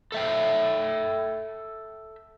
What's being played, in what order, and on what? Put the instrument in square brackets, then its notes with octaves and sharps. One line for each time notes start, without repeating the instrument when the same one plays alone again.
[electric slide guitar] A4 E5 G5